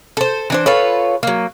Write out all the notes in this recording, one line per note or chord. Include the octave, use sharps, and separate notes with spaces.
A4 C5
E3 D4 C5
F4 A4 B4 C#5
F#3 A#3